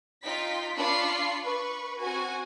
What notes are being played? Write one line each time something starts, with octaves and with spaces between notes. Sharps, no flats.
D#4 F4 G5 B6
D4 F4 A5 B5 C#6 C7
B4 C#6
C4 F#4 G#5